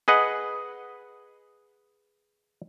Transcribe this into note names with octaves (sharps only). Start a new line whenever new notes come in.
G#4 B4 D#5 F#5